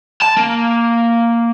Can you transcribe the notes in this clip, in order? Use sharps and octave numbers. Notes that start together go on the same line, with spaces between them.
A5
A#3